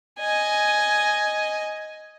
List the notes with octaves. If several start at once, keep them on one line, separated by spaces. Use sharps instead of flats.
D#5 G#5